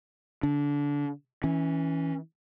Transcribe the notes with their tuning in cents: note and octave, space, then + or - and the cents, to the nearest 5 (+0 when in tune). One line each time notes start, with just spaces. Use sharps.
D3 -25 D4 -25
E3 -20 C#4 +0